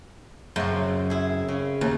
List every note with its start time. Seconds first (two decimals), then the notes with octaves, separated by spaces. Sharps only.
0.56 F#2 C#3 C4
1.10 E4 G#4
1.48 C#3
1.81 D#2